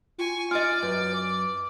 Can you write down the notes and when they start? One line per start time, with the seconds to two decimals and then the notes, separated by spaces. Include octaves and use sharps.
0.18 F4 G#5 C#6
0.51 F4 D5 D#5 G#5 F6 A6
0.83 F#2 B4
1.13 D6